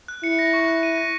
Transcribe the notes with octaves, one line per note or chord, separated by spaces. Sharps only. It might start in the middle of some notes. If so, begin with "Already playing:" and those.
F#6
E4 C#7
A#6
C#6
F#6
D#7
A#6